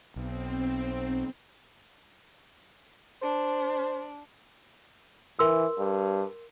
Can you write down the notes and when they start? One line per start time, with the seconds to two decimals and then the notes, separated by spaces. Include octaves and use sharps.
0.16 B1 C4
3.22 D4 C5
5.39 E3 A#4 C6 E6
5.78 G2